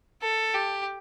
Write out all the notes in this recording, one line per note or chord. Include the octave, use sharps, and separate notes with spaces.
A4
G4